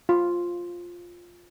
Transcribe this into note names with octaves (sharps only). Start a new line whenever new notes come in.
F4